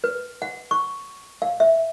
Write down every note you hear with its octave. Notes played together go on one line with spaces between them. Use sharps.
B4
F#5
C#6
F5
E5